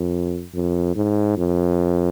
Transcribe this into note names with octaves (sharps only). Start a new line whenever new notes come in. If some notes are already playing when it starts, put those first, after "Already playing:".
Already playing: F2
F2
G#2
F2